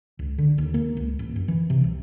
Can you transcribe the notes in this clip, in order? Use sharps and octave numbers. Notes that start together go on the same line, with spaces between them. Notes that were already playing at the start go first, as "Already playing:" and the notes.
C#2
D3
D#2
A#3
C#2
A1
F#2
E3
C3
C2